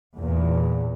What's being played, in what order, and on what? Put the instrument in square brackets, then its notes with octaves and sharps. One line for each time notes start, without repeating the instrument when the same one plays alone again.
[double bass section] E2 A#2